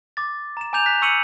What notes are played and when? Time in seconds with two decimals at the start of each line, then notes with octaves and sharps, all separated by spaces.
0.17 D6 A6
0.57 A#5 E7
0.73 G#5 A#5 D6 G6 E7 F7
0.86 F#6 B6
1.02 C#6 E6 C#7 D#7 F#7